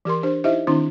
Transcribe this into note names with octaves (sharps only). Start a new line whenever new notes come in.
E3 G4 A#4 C6
D4 G4 C5
D#4 E4 G4 C5 D#5 E5
D#3 C4 D4 E4